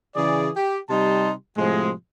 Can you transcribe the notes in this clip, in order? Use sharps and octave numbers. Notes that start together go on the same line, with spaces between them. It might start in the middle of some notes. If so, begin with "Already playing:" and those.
C#3 E3 G#4 D5
G4
C3 G3 D#4 A5 C6
A2 C3 F3 G#3